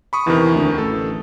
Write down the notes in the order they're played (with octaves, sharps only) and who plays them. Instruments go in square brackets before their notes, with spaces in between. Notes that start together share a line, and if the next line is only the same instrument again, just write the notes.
[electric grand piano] B5 C#6 D#6
[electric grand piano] E2 C3 D#3 [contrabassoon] E3
[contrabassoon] D2
[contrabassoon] A1 [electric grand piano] A4